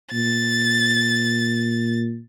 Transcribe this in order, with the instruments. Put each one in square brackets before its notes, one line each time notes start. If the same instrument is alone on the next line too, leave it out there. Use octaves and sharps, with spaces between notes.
[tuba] A#2 [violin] A6